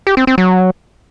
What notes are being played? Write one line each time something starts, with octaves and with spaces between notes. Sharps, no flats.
G4
C4
C4
F#3